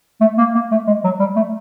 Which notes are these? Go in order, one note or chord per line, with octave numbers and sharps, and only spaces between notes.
A3
A#3
A#3
A3
G#3
F#3
G3
A3